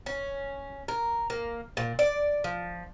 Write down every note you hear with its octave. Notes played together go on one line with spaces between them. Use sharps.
C#4
A#4
A#3
A#2
D5
F3